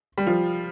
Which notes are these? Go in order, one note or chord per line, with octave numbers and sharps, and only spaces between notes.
G3
F3